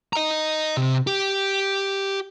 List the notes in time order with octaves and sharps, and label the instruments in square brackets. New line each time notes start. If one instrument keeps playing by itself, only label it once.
[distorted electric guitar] D#5 A#5
C3
G4